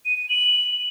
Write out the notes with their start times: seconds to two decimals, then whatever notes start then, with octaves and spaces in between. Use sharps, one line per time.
0.05 D#7
0.17 D#7
0.29 F#7